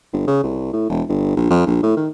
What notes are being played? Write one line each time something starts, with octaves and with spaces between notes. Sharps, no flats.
G1
C#3
C2
A2
E1
G1
A#1
F2
A#1
A2
D#3